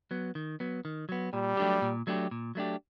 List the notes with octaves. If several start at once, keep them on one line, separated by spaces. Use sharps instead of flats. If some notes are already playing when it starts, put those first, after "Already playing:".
F#3 B3
D#3
F#3 B3
D#3
F#3 B3
A#2 G3
F#3 A3 D4 G4
A#2
F#3 A3 D4 G4
A#2
F#3 A3 D4 G4